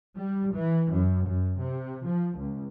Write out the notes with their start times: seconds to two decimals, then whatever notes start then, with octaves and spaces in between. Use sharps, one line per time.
0.17 G3
0.55 E3
0.93 F#2
1.25 F#2
1.58 C3
2.07 F3
2.39 C#2